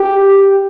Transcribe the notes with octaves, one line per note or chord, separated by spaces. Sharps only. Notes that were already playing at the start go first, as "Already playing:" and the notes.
Already playing: G4